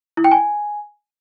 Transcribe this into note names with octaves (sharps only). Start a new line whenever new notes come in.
E4
G5
G#5